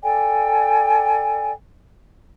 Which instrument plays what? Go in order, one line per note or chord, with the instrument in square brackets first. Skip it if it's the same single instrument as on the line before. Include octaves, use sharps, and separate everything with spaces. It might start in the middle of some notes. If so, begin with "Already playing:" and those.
[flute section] A4 D5 G5 G#5